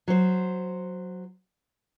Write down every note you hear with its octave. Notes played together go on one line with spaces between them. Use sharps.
F#3 C5